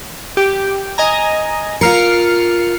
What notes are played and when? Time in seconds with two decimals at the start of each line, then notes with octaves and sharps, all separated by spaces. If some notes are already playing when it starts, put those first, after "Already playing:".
0.37 G4
0.98 D#5 G#5 A#5
1.81 F4 A#4 F6 C7 C#7